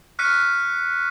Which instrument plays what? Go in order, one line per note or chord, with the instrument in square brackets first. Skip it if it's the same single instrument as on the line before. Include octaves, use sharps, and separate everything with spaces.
[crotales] C#6 F6 F#6 B6 C#7 D#7